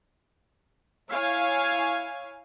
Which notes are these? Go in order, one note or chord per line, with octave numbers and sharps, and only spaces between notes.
E4 C#5 F5 G#5